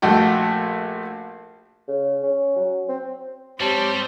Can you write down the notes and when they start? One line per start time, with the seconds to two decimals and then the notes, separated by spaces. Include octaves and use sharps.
0.02 A#1 A3 F#4 G5
1.88 C#3
2.23 C#4
2.56 F#3
2.89 C4
3.60 G#2 G3 C4 G4 C5 C#5 A5